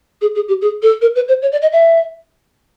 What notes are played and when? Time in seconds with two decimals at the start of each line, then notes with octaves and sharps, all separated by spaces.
0.21 G#4
0.35 G#4
0.48 G4
0.61 G#4
0.82 A4
1.01 A#4
1.15 B4
1.28 C5
1.42 C#5
1.52 D5
1.61 D#5
1.72 E5